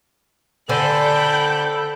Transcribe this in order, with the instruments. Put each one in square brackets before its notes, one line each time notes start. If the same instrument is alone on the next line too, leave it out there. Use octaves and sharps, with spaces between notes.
[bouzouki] D3 C5 G#5 [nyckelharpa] A4 [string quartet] G5 B5 F#6